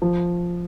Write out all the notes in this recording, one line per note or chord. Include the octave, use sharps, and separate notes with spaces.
F3